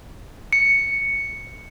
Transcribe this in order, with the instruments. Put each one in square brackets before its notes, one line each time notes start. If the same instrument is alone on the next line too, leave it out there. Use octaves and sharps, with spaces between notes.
[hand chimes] C#7